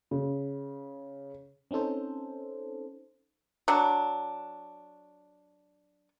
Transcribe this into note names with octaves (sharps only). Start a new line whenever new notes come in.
C#3
C4 C#4 D#4 A4 C5
F#3 D4